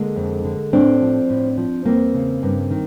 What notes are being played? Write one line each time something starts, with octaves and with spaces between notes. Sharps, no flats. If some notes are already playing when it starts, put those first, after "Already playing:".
Already playing: D3 G#3 A#3
F2
D3
A2 C4 D4
F3
A2
F3
E2 A#3 C4
C#3
G2
D#3